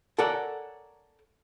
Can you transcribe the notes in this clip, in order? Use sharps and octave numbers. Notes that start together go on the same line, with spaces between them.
A4 A#4 C#5 D5 F#5 G#5